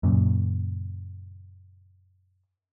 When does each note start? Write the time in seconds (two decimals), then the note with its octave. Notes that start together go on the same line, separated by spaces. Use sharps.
0.03 F#2 A#2 C#3